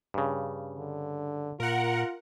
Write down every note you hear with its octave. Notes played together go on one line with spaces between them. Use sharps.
G2 C#3
D3
A#2 F4 A#4 F#5